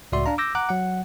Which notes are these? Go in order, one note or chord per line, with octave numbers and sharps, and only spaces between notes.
C#2 A2 F#4 D5 E5 C6
D4 F5 A#5
D6 E6 G6 A#6
F#5 A#5 D6 F#6
F#3 F#5